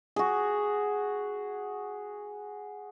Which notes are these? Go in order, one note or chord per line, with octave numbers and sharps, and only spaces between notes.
F#4 G#4